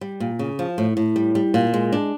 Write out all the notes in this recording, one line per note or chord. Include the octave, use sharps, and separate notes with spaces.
G3
A#2
C#3
F3
A2
A2
G3
G3
A#2
G#3
D4